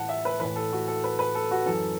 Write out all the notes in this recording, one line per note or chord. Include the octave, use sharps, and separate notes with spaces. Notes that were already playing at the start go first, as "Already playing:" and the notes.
Already playing: A2 E3 F#5 A5
E5
B4
A2 E3 B4
A4
F#4
A4
B4
B4
A4
F#4
F#2 E3 A4